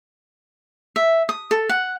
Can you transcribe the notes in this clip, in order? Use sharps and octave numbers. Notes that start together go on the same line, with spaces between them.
E5
D#6
A4
F#5